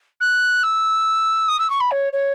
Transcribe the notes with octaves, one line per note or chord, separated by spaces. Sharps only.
F#6
E6
D#6
E6
C#6
B5
C#5
C#5